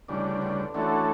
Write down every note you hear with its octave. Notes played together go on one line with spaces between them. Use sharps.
D2 C#3 E3 G3 D4
D3
D3 E3 A3 C#4 F#4 A4
D3